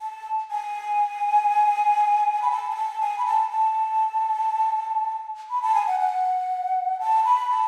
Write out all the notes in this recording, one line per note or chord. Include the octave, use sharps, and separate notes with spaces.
A5
G#5
B5
A5
G#5
A5
G#5
B5
A5
A5
B5
A5
G#5
F#5
F#5
A5
B5
A5